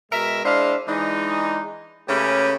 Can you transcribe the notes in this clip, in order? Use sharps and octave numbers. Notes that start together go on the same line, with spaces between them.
B2 G#3 A#4 E5
G#3 D4 E4 C5 F5
E3 G#3 D4 D#4
C#3 A3 A#3 C#4 G4 B4